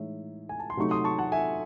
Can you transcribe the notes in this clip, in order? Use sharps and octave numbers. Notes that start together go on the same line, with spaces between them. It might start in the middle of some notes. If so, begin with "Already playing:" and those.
Already playing: A2 E3 G#3 D#4 C#5 E5
G#5
A5
C6
C3 F#3 A3 D#4 C#6
C6 D#6
A5 C#6
F#5 A5
E5 G#5